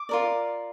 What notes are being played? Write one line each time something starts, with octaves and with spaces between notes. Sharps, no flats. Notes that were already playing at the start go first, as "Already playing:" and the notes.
Already playing: D6
F4 A#4 D5